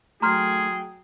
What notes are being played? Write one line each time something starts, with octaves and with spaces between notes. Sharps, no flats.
F#3 A3 G#4 G5 A#5 C6 F6